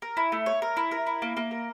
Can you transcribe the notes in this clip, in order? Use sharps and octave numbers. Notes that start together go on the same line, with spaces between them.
A#4
E4
A3
C#5
A#4
E4
A#4
E4
A#3
A#3
A#4